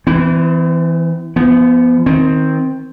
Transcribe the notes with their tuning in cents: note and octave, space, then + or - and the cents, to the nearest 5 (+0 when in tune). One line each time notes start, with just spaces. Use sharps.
E3 -5 C4 -45
F3 -35 B3 +0
D#3 +20 C4 +0